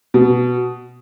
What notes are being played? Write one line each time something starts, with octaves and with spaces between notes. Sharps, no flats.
B2